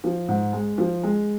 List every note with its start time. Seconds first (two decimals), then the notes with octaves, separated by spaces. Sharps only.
0.04 F3
0.28 G#2
0.53 G#3
0.78 F3
1.03 G#3